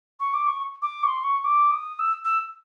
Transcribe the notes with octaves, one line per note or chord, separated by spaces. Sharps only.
C#6
D6
C#6
D6
C#6
C6
C#6
D6
D#6
E6
E6